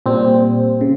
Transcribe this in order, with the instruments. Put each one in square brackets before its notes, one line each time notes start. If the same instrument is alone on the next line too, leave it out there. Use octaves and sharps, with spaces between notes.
[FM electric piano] A#2 G3 C4
C#3